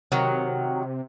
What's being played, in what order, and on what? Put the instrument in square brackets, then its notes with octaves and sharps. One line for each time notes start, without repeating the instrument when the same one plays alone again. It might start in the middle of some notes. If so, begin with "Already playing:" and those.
[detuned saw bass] C3 [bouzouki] D#3 F#3